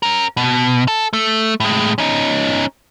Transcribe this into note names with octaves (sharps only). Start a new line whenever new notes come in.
C#4 A#4
B2
A4
A3
A2 G#3
C#4 D#4